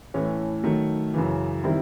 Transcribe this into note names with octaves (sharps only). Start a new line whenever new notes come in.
A2 E3 A3 C#4
D#3 F#3 A3
F#2 C#3 E3
D#3 G3 C4 E4